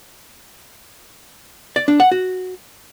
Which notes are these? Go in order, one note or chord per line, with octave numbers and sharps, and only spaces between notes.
D5
D4
F#5
F#4